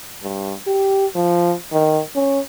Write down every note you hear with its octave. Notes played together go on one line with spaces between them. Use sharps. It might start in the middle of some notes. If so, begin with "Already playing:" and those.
G2
G4
F3
D#3
C#4